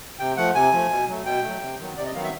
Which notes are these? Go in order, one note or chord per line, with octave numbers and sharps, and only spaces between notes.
C3 G5
F3 A3 F#5
C3 G#5
F3 A3
B2
F#3 A3
B2 G5
F#3 A3
C3
D#3 F#3 B3
C3 D5
D#5
D#3 F#3 B3 F5
E5